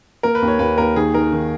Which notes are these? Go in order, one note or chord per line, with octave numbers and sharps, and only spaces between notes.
A#3 A#4
B4
D#2
C#5
D#2 B4
D#2 A#4
D#3 G#4
D#3 A#4
D#3